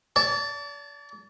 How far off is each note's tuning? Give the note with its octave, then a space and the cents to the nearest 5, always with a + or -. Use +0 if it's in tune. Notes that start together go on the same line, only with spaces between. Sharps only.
D5 -40 A5 +5